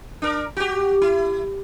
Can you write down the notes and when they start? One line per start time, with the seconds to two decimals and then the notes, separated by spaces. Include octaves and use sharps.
0.22 D4 A#4
0.57 F#4 G4
1.02 E4